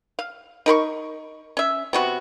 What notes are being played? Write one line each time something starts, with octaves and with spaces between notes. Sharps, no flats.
F5
D#4 A#4 B5 C#6
C#4 E5
C3 B3 F#4